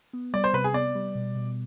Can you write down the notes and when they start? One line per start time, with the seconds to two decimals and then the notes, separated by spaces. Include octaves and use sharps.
0.13 B3
0.34 G3 D5
0.44 C5
0.54 C3 B4
0.64 G#4
0.74 B3 D5
0.95 G3
1.15 B2
1.35 B2